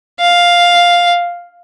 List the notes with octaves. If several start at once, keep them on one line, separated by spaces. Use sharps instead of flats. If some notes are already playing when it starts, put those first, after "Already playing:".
F5